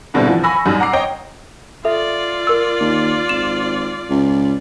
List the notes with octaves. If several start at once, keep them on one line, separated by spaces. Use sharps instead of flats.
G#2 B2 D3 G3 C4 E4
E3 F3
G#5 B5 C#6 E6 A#6
F#2 G3 D#4
F#5 A#5 D6 C7
C#5 D#5 G5
F4 A4 D5 E5
A#4 E6
D#2
G#1 E7
C#2